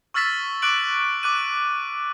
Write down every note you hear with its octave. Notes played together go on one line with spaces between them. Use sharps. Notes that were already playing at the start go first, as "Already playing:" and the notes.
C#6 E6 F6 A6 B6 E7
C#6 D6 F#6 D7 F#7
D6 F#6 D#7